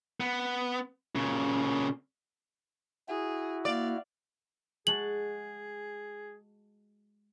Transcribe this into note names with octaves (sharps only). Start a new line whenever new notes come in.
B3
A#2 C#3
E4 F#4 G#4
A#3 D5 F5
G#3 F#4 G#4 A5 F#7